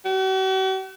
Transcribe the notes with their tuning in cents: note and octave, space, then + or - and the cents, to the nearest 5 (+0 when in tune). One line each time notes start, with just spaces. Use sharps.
F#4 +45